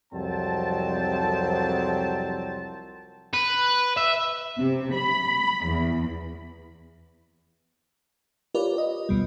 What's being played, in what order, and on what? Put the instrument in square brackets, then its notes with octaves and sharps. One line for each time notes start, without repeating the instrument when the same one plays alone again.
[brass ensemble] C2 F2 F#3 C4 A5
[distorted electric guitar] B4
E5
[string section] C3
B5
E2
[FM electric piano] F4 G4 A#4 B4 C#5 D5
D#5
D2 B2 G3